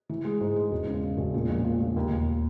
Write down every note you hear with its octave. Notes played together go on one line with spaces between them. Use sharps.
E3
G#3
G#2
G#3
E1
C#3
C#3
E1
A#2
A#1
A#2
A#2
D#2
D#2